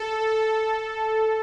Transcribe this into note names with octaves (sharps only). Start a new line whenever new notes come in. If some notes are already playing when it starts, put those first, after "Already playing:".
Already playing: A4